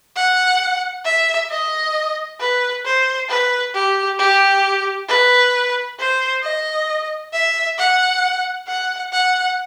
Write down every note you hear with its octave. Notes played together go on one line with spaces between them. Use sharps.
F#5
E5
D#5
B4
C5
B4
G4
G4
B4
C5
D#5
E5
F#5
F#5
F#5